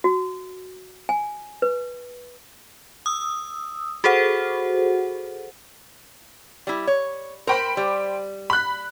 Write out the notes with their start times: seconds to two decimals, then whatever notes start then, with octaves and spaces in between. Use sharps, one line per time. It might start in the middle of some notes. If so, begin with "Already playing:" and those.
0.04 F#4
1.09 G#5
1.62 B4
3.06 D#6 E6
4.04 F#4 G#4 A4 C5 F#5
6.67 G3 E4
6.87 C#5
7.47 A#4 C5 G5 B5
7.77 G3
8.50 B5 F#6